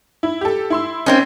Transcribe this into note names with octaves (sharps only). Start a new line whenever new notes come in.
E4
G4 A4
E4 C6 E6
A#3 C4 C#4 D#4